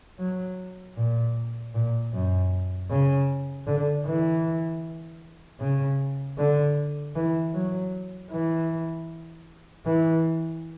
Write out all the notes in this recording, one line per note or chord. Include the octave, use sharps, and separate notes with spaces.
F#3
A#2
A#2
F#2
C#3
D3
E3
C#3
D3
E3
F#3
E3
E3